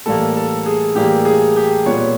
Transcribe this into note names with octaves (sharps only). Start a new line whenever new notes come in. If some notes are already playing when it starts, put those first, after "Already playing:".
A2 E3 G3 A#3 A4
A4
G#4
A2 E3 G3 A#3 G4
G#4
G4
A#2 G3 B3 C#5